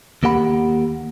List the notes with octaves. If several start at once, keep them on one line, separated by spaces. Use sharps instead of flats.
D#2 A#3 G4 F#5 B5